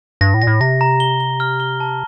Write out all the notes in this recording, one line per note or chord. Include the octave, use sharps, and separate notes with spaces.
G2 A#6
A2
A#2 A#6
A2
C3 A#6
A#5
G7
G7
F6
G7
A5